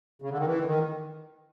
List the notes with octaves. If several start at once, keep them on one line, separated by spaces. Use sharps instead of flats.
C#3
D3
D#3
E3
D3
D#3